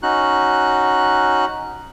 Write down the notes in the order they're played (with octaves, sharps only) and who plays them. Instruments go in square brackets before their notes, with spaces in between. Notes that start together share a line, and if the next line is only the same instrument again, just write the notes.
[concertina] C#4 D#4 F#4 F#6